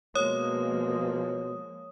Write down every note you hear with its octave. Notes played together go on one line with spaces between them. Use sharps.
B2 F3 G#3 A#3 C#5 D#6